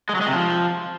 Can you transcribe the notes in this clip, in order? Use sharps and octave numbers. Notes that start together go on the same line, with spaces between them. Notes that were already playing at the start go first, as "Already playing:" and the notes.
G#3
F#3
G#3
C3
F3